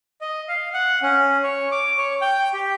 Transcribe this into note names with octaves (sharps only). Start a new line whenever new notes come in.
D#5
F5
F#5
C#4
C#5
D6
C#5
G5
G4